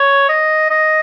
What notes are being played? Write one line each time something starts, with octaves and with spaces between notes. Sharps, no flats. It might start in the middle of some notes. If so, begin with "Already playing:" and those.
Already playing: C#5
D#5
D#5